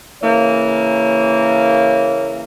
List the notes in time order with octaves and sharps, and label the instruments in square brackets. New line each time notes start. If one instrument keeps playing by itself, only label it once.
[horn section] C#3 E3 A#3 [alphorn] C#5